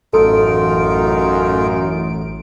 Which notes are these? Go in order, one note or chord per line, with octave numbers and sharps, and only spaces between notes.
A1 F#2 D#4 F4 A4 D7